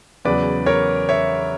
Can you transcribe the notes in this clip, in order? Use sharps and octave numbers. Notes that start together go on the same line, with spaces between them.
E2 C#3 F#3 B4 D5
A#4 C#5
C#5 E5